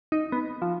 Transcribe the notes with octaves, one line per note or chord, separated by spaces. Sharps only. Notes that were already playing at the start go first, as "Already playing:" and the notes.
D#4
B3
F3